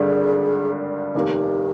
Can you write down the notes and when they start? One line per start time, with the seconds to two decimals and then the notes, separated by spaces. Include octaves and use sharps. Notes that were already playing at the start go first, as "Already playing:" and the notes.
Already playing: G#1 G2 D3 G3 G#4
1.15 F1 D#2 D#3 A#3 G4